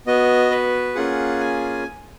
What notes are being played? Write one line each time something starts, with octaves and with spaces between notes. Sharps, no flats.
B3 F#4 D#5
B4
A#3 C#4 F4 G#4 F#5
G#5